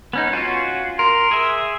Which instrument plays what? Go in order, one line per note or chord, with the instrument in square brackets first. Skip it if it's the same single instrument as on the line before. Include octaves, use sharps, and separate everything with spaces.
[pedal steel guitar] B3 C#4 D#4
C#4 F4 F#4
[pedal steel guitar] A#4 [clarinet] C6
[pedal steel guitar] G#4 E5